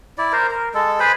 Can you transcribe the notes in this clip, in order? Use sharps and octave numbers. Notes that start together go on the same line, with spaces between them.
E4 D5
A#4 C5
A#4
G#3 A4
G#4 B4 C5 B5